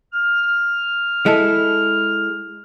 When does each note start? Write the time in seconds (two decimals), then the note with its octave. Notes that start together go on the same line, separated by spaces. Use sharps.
0.13 F6
1.26 G#3 E4 A4